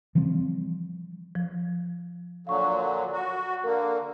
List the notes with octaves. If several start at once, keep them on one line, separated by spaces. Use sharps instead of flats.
E3 F3 G3 C4
F3
A#2 D3 F#3 F5 C#6
F#4
D3 A#3 A#4